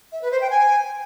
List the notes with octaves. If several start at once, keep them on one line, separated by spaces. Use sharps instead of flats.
E5
B4
C5
G5
G#5